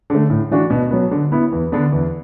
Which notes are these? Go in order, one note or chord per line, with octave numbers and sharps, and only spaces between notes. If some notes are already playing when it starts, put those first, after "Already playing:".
D3 A3
A2
E3 D4 F#4
B2
F#3 B3
D3
B3 E4
E2
D3 B3 D4
E2